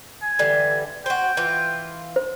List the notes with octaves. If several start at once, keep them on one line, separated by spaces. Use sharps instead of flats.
G#5
D3 E3 G3
F#4 C5 G5
E3 F4
C5